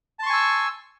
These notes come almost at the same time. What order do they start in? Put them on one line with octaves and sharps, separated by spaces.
A5 C6 C#6 G#5 E6